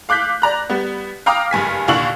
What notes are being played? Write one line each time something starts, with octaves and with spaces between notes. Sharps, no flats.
F5 D6 F#6 G6 B6
D5 A#5 F#6
G3 B3
F5 G5 A#5 D6 D#6 F6
F#1 G2 G#5 B6
D#2 A#2 D3 C#6 F#7